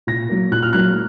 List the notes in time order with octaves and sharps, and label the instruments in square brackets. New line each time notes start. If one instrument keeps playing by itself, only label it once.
[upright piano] A#2 A#6
F#3 A#3
A#2 F#6
F6
F#3 A#3 F#6